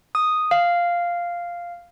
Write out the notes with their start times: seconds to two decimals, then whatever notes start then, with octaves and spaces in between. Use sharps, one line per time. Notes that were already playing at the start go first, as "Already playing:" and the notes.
0.15 D#6
0.51 F5